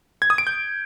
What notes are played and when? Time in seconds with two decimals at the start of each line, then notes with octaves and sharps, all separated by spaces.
0.22 G#6
0.30 D#6
0.38 D7
0.47 G6